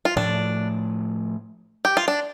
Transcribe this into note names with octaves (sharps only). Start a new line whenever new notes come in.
F4
A2 F3 A3 D4
G4
F4
D4